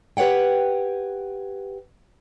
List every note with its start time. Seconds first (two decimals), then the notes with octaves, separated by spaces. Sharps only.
0.17 G4 B4 C#5 F#5 G5